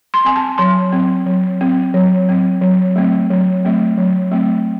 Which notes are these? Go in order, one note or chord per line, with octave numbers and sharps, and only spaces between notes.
C6
C4 G#5
A5
F#3 C6
C4
F#3
C4
F#3
C4
F#3
A3 C4
F#3
A3 C4
F#3
A3 C4